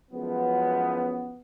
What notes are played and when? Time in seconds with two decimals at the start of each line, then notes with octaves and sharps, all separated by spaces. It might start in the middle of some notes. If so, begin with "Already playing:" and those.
0.11 F#1 F#2 F3 G#3 B3